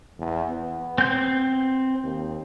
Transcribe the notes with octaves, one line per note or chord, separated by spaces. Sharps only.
E2
B3
C4 G6
D#2